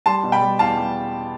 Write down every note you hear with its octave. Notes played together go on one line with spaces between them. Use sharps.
G3 A5 C6
B2
G5 B5
G3
E2 F5 A5
G3